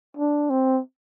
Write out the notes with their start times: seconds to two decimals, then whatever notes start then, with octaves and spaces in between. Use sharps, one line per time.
0.17 D4
0.50 C4